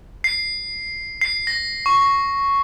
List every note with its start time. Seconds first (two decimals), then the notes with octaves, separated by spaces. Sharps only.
0.24 C7
1.21 C7
1.47 A#6
1.86 C#6